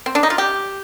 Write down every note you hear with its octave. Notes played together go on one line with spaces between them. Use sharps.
C4
D4
D#4
F4
G4